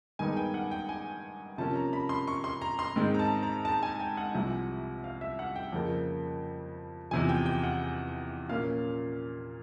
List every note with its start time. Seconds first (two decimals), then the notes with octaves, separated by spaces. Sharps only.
0.19 G2 D#3 G#3 B3 G#5
0.37 G5
0.54 F#5
0.71 G5
0.89 G#5
1.58 C3 F3 A#3 C#4 A5
1.76 A#5
1.93 B5
2.09 C6
2.27 C#6
2.44 C6
2.62 A#5
2.79 C6
2.96 G#2 D#3 G#3 C4
3.14 A#5
3.19 A5
3.43 A#5
3.65 A5
3.83 G#5
4.00 G5
4.17 F#5
4.34 C2 C3 F3
5.04 F5
5.21 E5
5.39 F#5
5.56 G5
5.73 F2 C#3 F3 A#3
7.11 E2 C3 F3 G#5
7.29 G5
7.46 G5
7.63 F#5
8.49 A#2 F3 A#3 C#4 F5